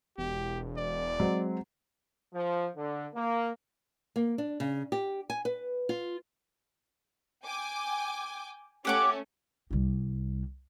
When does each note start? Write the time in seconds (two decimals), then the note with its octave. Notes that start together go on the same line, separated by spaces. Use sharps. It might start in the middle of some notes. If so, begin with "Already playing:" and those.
0.18 E1 G4
0.77 D5
1.20 F#3 G#3 C4
2.34 F3
2.77 D3
3.15 A#3
4.16 A#3
4.38 D4
4.60 C#3
4.92 G4
5.30 G#5
5.45 B4
5.89 F4
7.46 G5 G#5 D6
8.85 A3 C#4 G4 F#5 D6
9.71 C2 G3